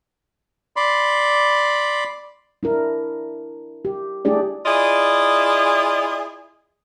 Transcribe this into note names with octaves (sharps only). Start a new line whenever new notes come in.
D5 B5 C6
D4 E4 A#4
G4
A3 D4 E4 G4 G#4 D5
E4 F4 G#4 D5 D#5